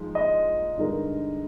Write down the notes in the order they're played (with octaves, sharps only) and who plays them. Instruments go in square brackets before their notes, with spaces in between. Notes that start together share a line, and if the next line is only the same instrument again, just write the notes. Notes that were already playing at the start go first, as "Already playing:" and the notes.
Already playing: [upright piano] F3 G#3 D#4
[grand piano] D#5
[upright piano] G2 D3 G#3 D#4 A#4